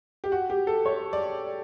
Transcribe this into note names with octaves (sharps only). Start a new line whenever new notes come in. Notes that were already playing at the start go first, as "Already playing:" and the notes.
G4
F#4
G4
A4
C#5
D5